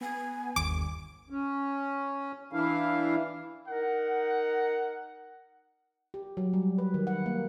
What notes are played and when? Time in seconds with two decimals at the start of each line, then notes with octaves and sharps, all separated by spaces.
0.01 B3 G#5
0.56 G1 D#2 D6 D7
1.30 C#4
2.53 E3 D4 E4 F5
3.68 D#4 A#4 F#5
6.14 G4
6.37 F#3
6.53 G3
6.78 B4
6.94 D#3
7.07 F#5
7.26 A#3